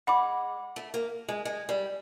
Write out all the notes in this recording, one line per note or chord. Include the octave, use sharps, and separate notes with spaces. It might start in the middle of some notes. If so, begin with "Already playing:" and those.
G#3 F#5 B5 D6
A3
A#3
G#3
G#3
G3